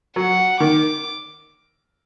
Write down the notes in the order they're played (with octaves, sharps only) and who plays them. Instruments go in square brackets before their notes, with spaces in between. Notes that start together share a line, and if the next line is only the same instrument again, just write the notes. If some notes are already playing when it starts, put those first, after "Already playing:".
[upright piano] F#3 [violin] F#5
[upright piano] D#3 [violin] D6